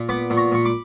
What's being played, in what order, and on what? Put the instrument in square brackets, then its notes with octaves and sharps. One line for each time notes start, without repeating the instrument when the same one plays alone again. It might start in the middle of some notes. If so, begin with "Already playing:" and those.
Already playing: [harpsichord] A#2
B3 B5 D6
A#2
A#5 C#6
A#2 C#6
B5 D6